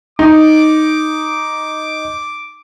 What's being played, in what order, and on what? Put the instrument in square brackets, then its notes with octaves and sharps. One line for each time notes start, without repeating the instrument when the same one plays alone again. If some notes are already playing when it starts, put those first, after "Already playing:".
[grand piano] D#4 [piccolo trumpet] D6